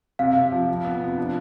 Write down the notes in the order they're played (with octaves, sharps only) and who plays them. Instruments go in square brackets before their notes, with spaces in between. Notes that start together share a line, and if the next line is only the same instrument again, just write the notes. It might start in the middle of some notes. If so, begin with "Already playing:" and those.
[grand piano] C3 [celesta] F5
[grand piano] C3
F3
F2
B3
C3
D4